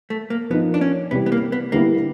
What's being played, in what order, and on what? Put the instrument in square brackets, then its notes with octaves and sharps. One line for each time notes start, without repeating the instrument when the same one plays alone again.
[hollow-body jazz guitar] A3
A#3
[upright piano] F3 A#3 D#4 [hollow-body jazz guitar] B3
[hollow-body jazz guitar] D4
C#4
[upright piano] C3 E3 G3 [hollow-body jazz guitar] B3
[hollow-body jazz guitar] B3
A#3
B3
[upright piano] D3 G3 B3 E4 [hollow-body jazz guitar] A#3